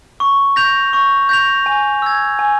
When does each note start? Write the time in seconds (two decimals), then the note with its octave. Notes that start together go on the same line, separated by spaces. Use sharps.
0.20 C#6
0.56 G6 A#6 F7
0.93 C#6
1.29 G6 A#6 F7
1.66 G#5
2.02 E6 G#6
2.39 G#5